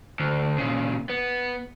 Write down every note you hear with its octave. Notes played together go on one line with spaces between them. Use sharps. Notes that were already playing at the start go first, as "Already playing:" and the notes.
D2
A#2 C#3
B3